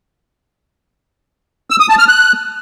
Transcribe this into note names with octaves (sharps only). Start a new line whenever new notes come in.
E6
D#6
A5
F6
F#6